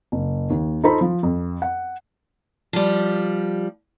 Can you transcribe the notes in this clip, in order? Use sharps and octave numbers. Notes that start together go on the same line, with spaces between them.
F#1
D#2
D#4 F4 A4 C5 A#5 B5
F3
F2
F#5
F3 G3